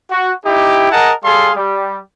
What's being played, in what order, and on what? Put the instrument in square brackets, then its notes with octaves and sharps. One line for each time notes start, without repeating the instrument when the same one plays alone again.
[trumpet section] F#4
D#4 E4 G4
G#4 A#4 D#5 F#5 A5
G3 G#4 A4 F5 C6
G3